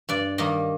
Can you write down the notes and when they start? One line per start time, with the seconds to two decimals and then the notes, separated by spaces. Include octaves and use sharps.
0.09 G2 D5
0.38 D#3 G3 A#3 D#5